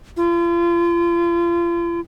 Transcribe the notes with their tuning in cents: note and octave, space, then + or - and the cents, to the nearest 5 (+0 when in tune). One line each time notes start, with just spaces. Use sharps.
F4 -35